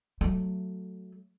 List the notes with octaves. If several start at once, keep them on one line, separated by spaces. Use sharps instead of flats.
F#3 A3